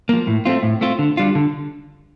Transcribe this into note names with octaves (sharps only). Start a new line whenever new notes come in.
F3 A#3
A2
A3 C4 F4
A2
A3 C4 F4
D3
G3 D4 F4
D3